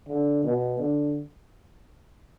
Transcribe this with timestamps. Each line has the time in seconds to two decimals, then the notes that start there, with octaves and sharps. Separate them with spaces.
0.09 D3
0.44 B2
0.79 D3